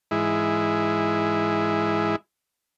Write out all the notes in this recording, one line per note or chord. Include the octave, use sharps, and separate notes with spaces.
G#2 E3 G#3 E4